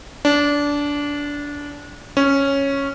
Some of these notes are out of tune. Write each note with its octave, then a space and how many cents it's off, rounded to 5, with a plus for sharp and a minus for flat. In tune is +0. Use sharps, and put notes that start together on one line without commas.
D4 -20
C#4 -5